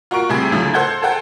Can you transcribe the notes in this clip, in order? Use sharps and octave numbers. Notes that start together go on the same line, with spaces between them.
F4 F#4 A#4 C#6 D7
A2 C3 G3 C4 G#4
C#2 A2 D3 F3 F#3
A4 C5 F#5 G6 G#6
G#4 A4 C5 F#5 G5 A5